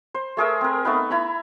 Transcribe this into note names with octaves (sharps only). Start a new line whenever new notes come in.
C5
A3 G#4 A#4 E5
C4 A#4
A3 B3 D#4 B4
E4 A#5 B5